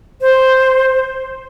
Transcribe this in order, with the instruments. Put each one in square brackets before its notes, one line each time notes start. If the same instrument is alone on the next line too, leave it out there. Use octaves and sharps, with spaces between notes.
[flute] C5